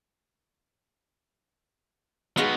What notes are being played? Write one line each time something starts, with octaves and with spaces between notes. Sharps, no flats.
G#3 B3 D#4 F#4 F5